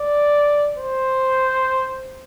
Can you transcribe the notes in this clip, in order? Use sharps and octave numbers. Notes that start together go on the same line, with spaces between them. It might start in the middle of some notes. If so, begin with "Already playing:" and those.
Already playing: D5
C5